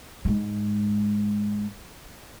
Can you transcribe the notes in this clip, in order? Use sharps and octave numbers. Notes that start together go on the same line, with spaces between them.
G#2 G#3